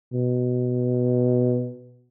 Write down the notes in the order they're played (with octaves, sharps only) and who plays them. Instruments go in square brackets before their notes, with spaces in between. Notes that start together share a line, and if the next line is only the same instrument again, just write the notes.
[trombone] B2